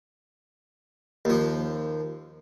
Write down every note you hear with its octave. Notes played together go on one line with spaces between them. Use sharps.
D#2 F3